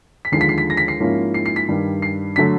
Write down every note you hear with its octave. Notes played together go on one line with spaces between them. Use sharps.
B6
D#2 D3 F3 G#3 C7
B6
C7
B6
A#6
B6
C7
G#2 F3 A#3 C#4 E4
C7
C7
B6
G2 D#3 G3
C7
D3 F#3 A3 B6